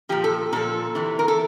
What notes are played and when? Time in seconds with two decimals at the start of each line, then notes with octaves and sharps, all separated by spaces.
0.09 A#2 F3 G4
0.24 A4
0.53 A#2 F3 A4
0.95 C3 E3
1.19 A#4
1.28 A4